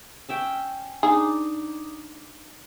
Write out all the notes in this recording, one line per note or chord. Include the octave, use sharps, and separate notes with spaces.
C#4 E5 G5
D4 D#4 G#4